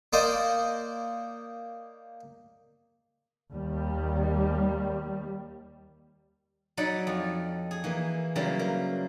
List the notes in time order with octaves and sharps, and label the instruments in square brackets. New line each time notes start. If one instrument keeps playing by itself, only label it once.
[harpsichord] A#3 D#4 C5 D5 D#5
[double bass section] D#2 G3
[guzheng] F#3 D#4 D5 F#5 B5
F2
G#4
E3 A#3
C#3 F#3 G3 A#3 E4
A#3